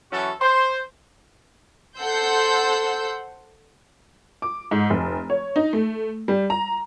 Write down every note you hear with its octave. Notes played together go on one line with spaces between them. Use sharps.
E3 F#3 C#4 F#4 A4
C5
A4 C5 F#5 C6 E6 G6
D6
G#2
F1
C#5
D#4
A3
G3
A#5